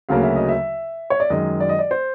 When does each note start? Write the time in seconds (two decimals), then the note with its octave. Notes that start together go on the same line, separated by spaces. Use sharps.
0.09 D2 C#3 F#3 A#3 F5
0.23 E5
0.36 D#5
0.49 E5
1.10 C#5
1.20 D5
1.30 F#2 D#3 G#3 D#5
1.60 D5
1.69 D#5
1.79 D5
1.91 C5